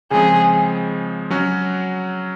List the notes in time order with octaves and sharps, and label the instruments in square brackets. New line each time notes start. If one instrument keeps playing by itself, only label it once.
[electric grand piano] C#3 F3 G#3 C4 [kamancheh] G#4
[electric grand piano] F#3 C#4 F#4